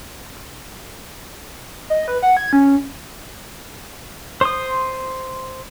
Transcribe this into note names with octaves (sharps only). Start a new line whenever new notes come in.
D#5
B4
F#5
G#6
C#4
C5 C6 D#6